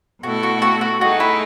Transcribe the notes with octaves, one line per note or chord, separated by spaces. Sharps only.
B2 A3 E4 F#4 A4
F#4
F#4
F#4
A3 D#4 F#4 G#4
E4